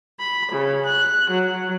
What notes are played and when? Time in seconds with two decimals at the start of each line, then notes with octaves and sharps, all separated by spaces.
0.19 B5
0.52 C#3
0.87 F#6
1.30 F#3